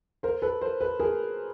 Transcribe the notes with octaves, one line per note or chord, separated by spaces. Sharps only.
A#4 C5
A4 B4
A#4 C5
A4 B4
G#4 A#4